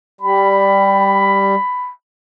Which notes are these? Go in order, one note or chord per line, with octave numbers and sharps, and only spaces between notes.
G3 B5